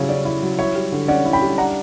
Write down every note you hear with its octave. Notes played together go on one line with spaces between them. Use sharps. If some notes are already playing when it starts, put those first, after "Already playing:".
Already playing: C#3 F#3 G3 E4 C#5
C#4 D5
E4
F#3
E4 C#5 E5
G3
D3
C#4 D5 F#5
E4
G5 B5
G3
D4 F#5 A#5